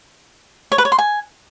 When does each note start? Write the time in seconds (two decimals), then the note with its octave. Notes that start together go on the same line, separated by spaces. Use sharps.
0.72 C#5
0.78 B4
0.85 C#5
0.92 C6
0.98 G#5